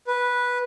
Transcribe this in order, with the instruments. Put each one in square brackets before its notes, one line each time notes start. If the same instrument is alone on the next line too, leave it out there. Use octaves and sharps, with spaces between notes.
[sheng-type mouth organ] B4